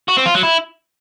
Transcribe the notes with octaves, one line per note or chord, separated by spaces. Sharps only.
F#4
C4
F4
F#3
E4